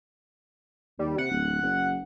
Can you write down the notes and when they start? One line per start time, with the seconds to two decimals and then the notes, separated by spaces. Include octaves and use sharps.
0.99 D#2 G3
1.18 C3 F#5
1.31 D1
1.63 F#1